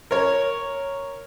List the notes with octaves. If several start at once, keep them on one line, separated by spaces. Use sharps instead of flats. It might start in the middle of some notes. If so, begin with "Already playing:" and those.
A#4 C#5